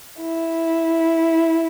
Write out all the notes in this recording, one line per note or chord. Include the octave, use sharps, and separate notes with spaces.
E4